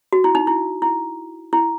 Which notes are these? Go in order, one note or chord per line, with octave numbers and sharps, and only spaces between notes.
F#4
E4
D#4
E4
E4
E4